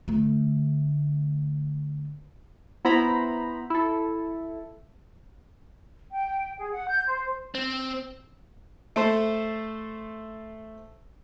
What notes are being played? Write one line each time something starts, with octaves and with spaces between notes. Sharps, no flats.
D3 A3
B3 E4 C5 A#5 B5
E4 A4
G5
G#4
F#5
G6
C5
C4
A3 A4 C5